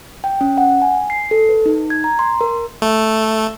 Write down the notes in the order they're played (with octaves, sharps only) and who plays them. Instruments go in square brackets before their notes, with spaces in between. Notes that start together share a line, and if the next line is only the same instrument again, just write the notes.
[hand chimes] G5
C#4
F#5
G#5
C7
A4
B4
D#4
G#6
A#5
C6
A#4
[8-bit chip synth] A3